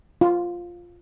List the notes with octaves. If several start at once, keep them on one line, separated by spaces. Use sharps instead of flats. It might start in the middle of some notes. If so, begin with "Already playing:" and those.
F4